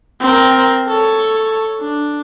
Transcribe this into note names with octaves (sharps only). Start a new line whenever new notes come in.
C4 A#4
A4 C#5
D4